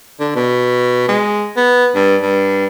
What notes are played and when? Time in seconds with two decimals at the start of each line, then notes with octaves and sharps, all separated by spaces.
0.20 D3
0.36 B2
1.08 G#3
1.57 B3
1.95 G2
2.22 G2